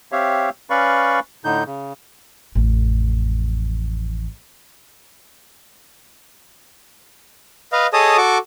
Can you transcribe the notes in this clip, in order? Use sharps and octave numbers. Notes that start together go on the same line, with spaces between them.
C4 G4 C#5 E5 F5
C#4 B4 D5 F5 B5 C#6
A2 D3 D#4 G6
C#3
A1 F2
B4 D#5 F5
G#4 A4 C#5 D#5 A5 D#6
F#4 A4 C#6 D6